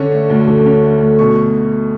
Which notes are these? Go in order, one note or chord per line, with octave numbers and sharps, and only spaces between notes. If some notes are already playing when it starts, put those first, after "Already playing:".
Already playing: D3 C#4 C#6
A3
D2
D3
C#4
A3
D2
B2 C#6